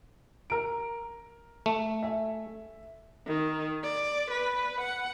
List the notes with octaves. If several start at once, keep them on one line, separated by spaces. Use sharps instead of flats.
A#4 D7
A3
E5 G#5
D#3
D5
B4
F#5